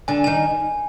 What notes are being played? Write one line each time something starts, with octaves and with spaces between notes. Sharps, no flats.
D3 D4 G#5
D#3 D#4 G#5